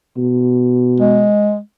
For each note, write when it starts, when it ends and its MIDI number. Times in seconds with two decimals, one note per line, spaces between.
0.18 1.28 47
1.00 1.59 56